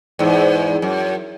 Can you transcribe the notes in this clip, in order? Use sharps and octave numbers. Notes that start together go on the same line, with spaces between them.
E2 G#2
F#2